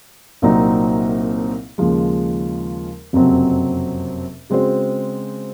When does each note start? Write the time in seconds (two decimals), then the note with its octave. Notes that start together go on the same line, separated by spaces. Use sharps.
0.42 C2 A#2 F#3 C4 D#4
1.78 D#2 C#3 F3 G#3
3.13 F#1 F2 C3 F#3 C4
4.50 C#3 G#3 C4 F#4 C5